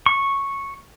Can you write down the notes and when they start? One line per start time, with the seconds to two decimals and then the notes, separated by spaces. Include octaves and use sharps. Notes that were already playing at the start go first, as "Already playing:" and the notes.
0.06 C#6